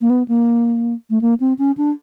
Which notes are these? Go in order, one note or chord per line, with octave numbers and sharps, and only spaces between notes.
A#3
B3
A#3
A3
A#3
C4
C#4
D4